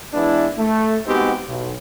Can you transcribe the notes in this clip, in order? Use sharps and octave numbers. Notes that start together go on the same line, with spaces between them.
E3 G#3 B3 D4 E4
A3
G#3 B3 C4 D#4 F#4 G4
B1